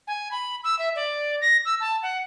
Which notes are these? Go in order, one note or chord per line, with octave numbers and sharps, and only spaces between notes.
G#5
B5
E6
E5
D5
A#6
E6
A5
F#5